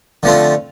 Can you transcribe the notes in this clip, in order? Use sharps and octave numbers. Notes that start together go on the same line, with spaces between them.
D3 F3 A3 C4 F4